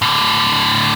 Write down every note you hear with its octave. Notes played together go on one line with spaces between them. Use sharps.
A2 D3